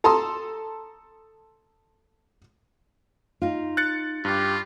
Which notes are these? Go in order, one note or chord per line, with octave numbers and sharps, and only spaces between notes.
A4 A5 A#5 C6 D#6
D#4 F4
F#6 A6 C#7
G2 F4 G4